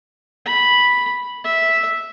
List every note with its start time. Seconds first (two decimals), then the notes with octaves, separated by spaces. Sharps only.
0.46 B5
1.44 E5